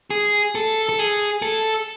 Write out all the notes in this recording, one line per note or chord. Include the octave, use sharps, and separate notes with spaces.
G#4
A4
A4
G#4
A4